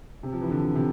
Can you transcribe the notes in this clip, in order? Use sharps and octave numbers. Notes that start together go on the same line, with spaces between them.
C3
F3
E3
D3
C3